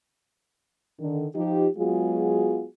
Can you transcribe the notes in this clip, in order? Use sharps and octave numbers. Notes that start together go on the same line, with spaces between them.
D3 D#3
F3 D#4 G4
F#3 G#3 B3 F4 F#4 G#4